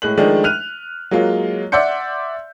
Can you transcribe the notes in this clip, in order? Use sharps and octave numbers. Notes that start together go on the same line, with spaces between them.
A2 G#3 F#6 F#7
D#3 F3 G#3 A3 D4
F6 F#6 D#7 F7
F#3 G#3 A#3 F4
D5 E5 F#5 C6 G6 C#7